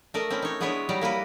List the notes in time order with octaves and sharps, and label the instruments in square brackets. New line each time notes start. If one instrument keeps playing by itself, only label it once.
[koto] A3 A#4 D5 D#5
C4 C#4 E4
D#4 C#5
G#3 B3 D4 E4 B4 C#5
F#3 G3 D#4 D5 A#5
A#3 E4 A#4 B4